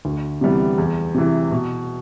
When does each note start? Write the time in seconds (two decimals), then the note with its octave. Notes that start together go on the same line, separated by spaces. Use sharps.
0.05 D2
0.41 C3 E3 G3 B3
0.78 E2
1.14 C3 E3
1.51 B2